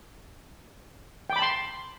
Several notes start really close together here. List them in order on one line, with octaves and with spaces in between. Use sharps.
G5 D6 B5 A5 C6